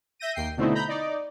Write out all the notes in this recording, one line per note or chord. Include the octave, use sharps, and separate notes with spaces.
E5 G6 A#6 D#7
D#2 G5 C7
B2 D3 A3 C4 D#4 E4
A#5 B5 G6
D#4 D5